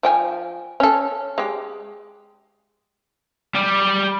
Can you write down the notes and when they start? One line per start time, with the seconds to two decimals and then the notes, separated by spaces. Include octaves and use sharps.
0.03 F3 G5 G#5
0.80 C#4 A4
1.38 G#3 G4
3.55 G3